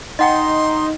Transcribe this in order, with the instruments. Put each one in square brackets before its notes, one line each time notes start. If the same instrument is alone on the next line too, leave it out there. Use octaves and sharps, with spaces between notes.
[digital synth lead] D#4 [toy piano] D#5 F#5 G5 [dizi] C6